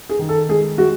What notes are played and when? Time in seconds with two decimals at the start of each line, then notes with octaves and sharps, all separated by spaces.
0.10 G#4
0.19 D#3
0.29 A4
0.49 G#3 G#4
0.78 G#3 F#4